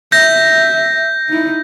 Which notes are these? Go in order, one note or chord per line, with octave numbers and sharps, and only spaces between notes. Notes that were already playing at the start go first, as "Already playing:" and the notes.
E5 G6 A#6
D#4 E4